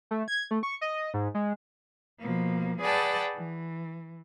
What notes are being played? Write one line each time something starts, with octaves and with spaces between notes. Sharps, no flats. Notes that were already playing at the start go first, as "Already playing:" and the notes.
A3
G#6
A3
C#6
D#5
G#2
G#3
B2 F3 A#3
G#4 B4 D5 F#5 G5 A5
E3